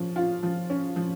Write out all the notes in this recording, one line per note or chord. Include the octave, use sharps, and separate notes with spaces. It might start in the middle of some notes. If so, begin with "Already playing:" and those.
Already playing: F3 C#4
F4
F3
C#4
F3